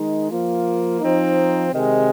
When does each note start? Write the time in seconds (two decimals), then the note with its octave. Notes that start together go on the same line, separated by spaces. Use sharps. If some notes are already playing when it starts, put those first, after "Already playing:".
Already playing: D#3 G#3 D#4
0.30 F3 A#3 F4
1.00 F3 C4 D#4
1.72 C3 D#3 G#3